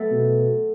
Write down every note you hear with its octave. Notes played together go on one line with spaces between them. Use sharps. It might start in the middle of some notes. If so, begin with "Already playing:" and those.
Already playing: A3 B3
B2